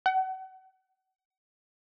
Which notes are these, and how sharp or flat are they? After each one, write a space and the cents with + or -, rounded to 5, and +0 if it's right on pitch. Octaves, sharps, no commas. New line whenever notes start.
F#5 +35